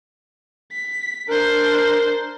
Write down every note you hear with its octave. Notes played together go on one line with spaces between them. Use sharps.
B6
D4 A#4 C5